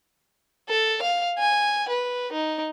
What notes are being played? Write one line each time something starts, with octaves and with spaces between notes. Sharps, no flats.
A4
F5
G#5
B4
D#4